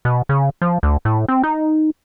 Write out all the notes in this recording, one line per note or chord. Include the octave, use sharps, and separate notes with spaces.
B2
C#3
F3
D2
A2
C4
D#4